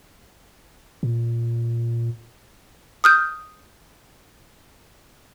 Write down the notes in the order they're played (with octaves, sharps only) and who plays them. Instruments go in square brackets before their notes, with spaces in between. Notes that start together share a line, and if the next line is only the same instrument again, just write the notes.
[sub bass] A#2
[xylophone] D#6 F6 G6